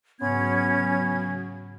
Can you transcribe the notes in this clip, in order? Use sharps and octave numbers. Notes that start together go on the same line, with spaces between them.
G#2 C#3 F#3 B3 C#4 C#5 G#6